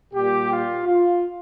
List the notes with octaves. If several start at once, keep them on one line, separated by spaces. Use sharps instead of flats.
A#2 G3 G4
F4
F4